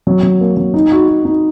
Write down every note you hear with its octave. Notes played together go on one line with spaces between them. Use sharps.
F#3
F#3
A#3
F#3
D#4
F#4
F#4
D#4